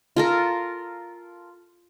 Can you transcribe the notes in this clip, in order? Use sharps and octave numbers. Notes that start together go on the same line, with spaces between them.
F4 A4 A#4